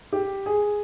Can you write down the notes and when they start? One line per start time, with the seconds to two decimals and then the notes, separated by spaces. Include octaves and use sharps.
0.13 G4
0.46 G#4